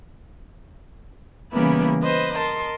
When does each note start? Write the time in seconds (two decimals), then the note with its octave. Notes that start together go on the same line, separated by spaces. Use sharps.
1.52 C#3 E3 G3 A#3 B3 E4
2.03 B4 C5 D#5
2.34 A#4 D#5 A5 C6